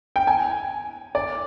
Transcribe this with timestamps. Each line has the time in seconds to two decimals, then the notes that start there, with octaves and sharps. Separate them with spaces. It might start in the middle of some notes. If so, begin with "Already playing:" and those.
0.16 G5
0.27 G#5
1.15 D5